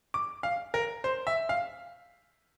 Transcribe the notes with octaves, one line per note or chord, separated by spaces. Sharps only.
D6
F5
A#4
C5
E5
F5